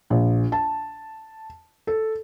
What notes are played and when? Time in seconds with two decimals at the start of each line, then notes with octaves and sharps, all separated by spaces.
0.10 A#1
0.52 A5
1.87 A4